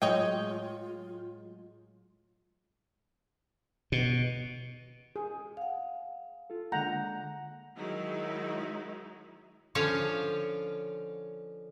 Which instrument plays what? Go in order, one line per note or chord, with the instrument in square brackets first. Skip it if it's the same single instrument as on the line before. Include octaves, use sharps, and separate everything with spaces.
[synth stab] A2 F#3 G#3 [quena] F4 [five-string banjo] C#5 D#5 G5
[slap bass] B2
[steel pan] G#4
[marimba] F5 F#5
[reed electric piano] F4 A4
[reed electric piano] D3 G#3 A#3 [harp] F#5 [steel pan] A#5 [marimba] G6
[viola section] D#3 F#3 G#3 D#4 E4
[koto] D3 F3 C#4 C#5 F5